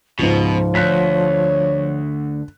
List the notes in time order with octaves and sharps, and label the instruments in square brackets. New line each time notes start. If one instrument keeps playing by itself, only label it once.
[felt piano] C#2 G#2 [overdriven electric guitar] B2 [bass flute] F3
[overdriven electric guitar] D2 [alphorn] C#5 [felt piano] F#6 B6